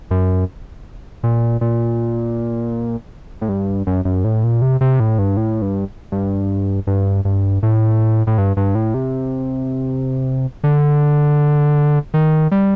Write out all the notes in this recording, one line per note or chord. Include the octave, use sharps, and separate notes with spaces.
F#2
A#2
A#2
A2
G2
F#2
F#2
A2
A#2
C3
C3
A2
G2
A2
G2
G2
G2
G2
A2
A2
G2
G2
A2
C3
D3
D#3
G3